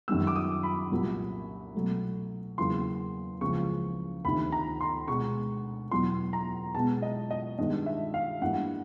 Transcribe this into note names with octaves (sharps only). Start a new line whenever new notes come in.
F#2 D#3 G3 B3 E6
D6
D#6
B5
C2 A#2 F#3 A#3
B2 F#3 A3
E2 C#3 F#3 A#3 C6
C#2 C#3 F3 A#3 C#6
D2 C3 D#3 B5
A#5
C6
B2 G#3 B3 C#6
E2 B2 F#3 C6
A#5
B2 G#3 B3 A5
D#5
D#5
G2 D#3 G#3 B3 D#5
E5
F5
G2 E3 G3 A#3 F#5